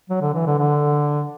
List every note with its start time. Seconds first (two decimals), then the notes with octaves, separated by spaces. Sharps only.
0.10 F#3
0.21 D3
0.34 E3
0.46 D3
0.58 D3